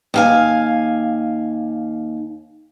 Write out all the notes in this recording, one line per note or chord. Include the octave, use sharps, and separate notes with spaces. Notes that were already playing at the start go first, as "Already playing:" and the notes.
D#2 F5 G#5